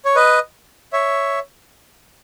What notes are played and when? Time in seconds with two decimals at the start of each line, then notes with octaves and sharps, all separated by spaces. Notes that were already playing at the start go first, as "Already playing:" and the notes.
0.05 C#5
0.15 B4 D#5
0.93 C#5 E5